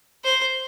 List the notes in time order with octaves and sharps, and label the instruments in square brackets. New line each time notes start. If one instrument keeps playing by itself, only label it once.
[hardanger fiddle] C5